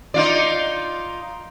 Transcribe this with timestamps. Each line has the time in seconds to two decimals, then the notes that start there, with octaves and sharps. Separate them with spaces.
0.14 D#4 F4 D5